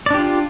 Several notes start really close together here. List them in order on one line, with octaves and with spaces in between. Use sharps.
D5 D4 G4 F4